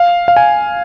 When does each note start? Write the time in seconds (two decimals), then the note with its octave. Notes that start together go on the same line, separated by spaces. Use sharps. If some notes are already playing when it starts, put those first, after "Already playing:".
Already playing: F5
0.28 F5
0.37 G#5